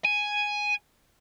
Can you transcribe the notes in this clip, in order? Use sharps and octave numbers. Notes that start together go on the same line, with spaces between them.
G#5